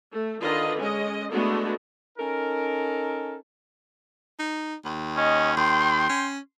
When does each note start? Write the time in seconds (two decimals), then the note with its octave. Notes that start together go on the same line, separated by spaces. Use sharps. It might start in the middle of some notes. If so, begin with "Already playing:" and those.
0.11 A3
0.41 D3 D#3 F4 B4 D#5
0.80 G#3 C#4 D#5
1.31 G#3 A3 B3 D4 F#4 A4
2.18 C#4 D#4 A4 A#4
4.39 D#4
4.85 D#2
5.16 C#4 D#5
5.57 D#2 G5 C6
6.09 C#4